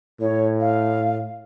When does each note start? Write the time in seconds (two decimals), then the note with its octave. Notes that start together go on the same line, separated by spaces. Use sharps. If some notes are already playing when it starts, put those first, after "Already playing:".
0.21 A2 C#5
0.60 F5